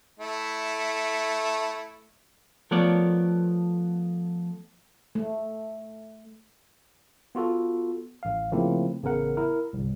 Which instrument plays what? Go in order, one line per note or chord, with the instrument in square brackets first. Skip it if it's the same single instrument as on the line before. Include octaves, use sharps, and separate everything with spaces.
[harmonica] A3 E4
[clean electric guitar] F3 A3 B3 A#4 C#5 D5
[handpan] A3
[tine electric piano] B3 F4 F#4 A4
A1 F5
C#3 F3 A3 A#3 C4 E4
A1 C#3 B3 A#4 F#5
E4 A#4
G1 C2